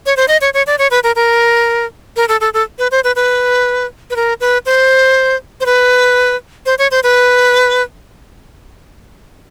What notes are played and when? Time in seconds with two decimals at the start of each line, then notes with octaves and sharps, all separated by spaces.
0.06 C#5
0.17 C5
0.28 D#5
0.41 C#5
0.54 C#5
0.67 D5
0.79 C#5
0.91 B4
1.04 A#4
1.16 A#4
2.16 A#4
2.29 A4
2.41 A4
2.54 A4
2.79 B4
2.92 C5
3.04 B4
3.16 B4
4.10 B4
4.16 A#4
4.41 B4
4.66 C5
5.61 C5
5.66 B4
6.66 C5
6.79 C#5
6.91 C5
7.04 B4